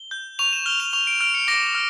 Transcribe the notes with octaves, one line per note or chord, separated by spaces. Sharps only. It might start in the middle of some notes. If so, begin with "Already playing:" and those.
Already playing: G7
G6
C#6 F7
E7
F6 G7
F7
C#6 F7
D7
F6 D7
C#7
D6 A#6
F6